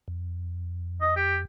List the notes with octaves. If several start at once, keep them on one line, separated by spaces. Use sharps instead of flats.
F2
D#5
G4